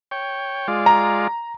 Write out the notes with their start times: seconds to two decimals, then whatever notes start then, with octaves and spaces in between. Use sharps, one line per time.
0.11 C#5 G5
0.68 G#3 F4 D5
0.86 A#5